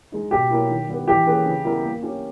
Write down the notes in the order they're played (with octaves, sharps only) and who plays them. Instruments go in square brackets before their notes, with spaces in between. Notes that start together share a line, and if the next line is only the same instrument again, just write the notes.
[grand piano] G#3 D#4
[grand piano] B2 [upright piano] G4
[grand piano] A#3 E4 A#4 C#5
D#3
G3 B3 G4 B4
[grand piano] E3 [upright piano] G4
[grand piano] A#3 C#4 G#4 B4
C#3
G3 B3 E4 A#4
A#3
C#4 G4